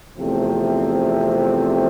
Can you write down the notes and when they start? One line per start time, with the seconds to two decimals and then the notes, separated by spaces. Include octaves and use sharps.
0.16 E2 C3 F3 A3 C4